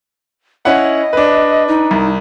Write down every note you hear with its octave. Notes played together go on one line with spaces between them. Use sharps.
C#4 E4 D#5 F#5
D4 B4
D#4
C2